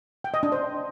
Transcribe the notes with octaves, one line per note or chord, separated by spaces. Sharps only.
G5
D#5
D4
C5